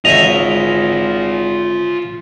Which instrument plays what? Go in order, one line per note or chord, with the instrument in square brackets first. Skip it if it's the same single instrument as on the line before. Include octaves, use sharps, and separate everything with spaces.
[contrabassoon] G#1 [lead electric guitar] F4 C#5 [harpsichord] D#5 E5 [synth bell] F7